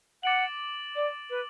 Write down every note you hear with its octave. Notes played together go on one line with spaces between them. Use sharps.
F#5 D6 A6 D7 F#7
D5
B4